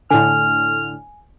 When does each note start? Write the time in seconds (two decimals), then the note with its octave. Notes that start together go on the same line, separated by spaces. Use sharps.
0.10 A2 D3 G#5 F6